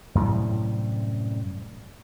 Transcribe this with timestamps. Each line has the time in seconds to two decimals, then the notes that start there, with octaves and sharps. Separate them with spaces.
0.15 F#2 A2 C3 G3